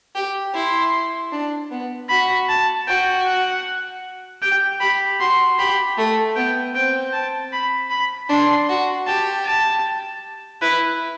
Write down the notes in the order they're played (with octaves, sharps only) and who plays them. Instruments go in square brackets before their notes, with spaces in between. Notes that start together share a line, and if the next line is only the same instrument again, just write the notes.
[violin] G4
[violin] E4 [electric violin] C6
[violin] D4
B3
[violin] F#4 [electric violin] B5
[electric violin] A5
[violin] F#4 [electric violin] G5
[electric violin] F#5
[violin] G4 [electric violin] G5
[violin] G4 [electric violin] B5
[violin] F#4 [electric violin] C6
[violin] G4 [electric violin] B5
[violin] A3
[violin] B3 [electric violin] G5
[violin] C4 [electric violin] G5
[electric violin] A5
B5
B5
[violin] D4 [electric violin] C6
[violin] F#4
[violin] G4 [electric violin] A5
[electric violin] A5
[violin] E4 [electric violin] B4